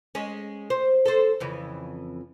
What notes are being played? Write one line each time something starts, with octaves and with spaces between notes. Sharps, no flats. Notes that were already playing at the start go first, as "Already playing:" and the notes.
G#3 C#4
C5
A4 C5
F2 C#3 E3